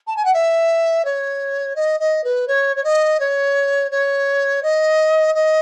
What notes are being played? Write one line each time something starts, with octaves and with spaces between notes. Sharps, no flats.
A5
G#5
F#5
E5
C#5
D#5
D#5
B4
C#5
C#5
D#5
C#5
C#5
D#5
D#5